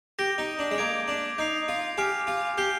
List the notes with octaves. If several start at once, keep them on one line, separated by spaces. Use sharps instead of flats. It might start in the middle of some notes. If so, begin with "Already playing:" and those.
G4 G6 A#6 D7 G7
D#4
D4
G#3
A#3 D6 G#6 D7 F7
D4
D#4 G6 C7 F7
F4
G4 G#5 D6 F6 C7
F4
G4 G6 C7 G7